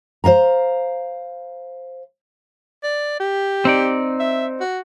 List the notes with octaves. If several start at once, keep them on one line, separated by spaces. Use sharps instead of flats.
C5 D#5 F5 A#5
D5
G4
C4 D#4 D5
E5
F#4